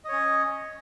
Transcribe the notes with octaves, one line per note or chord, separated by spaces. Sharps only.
C#4 C#5 D#5